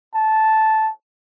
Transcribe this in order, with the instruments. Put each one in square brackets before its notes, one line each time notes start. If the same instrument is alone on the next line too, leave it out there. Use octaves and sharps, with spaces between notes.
[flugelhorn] A5